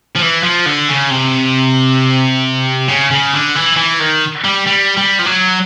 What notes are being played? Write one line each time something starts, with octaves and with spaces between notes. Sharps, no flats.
F3
E3
F3
D3
C#3
C3
C#3
C#3
D3
E3
E3
D#3
G3
G3
G3
F3
F#3